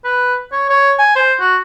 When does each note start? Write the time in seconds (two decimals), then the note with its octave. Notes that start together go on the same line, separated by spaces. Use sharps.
0.04 B4
0.52 C#5
0.69 C#5
0.99 G#5
1.16 C5
1.40 F#4